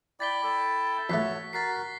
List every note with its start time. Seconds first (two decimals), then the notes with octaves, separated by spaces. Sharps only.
0.20 E4 D5 G5 A6 B6 G7
0.43 A4
1.10 E2 A3 F#4 C#5 B6
1.53 F#4 A#4 A6 B6 C7